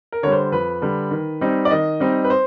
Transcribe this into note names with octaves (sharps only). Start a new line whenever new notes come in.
A#4
D3 G3 C#5
C5
F2 B4
D3 G3
D#3
G3 C4 D#4
D5
D#3 D#5
G3 C4 D#4
B4
C5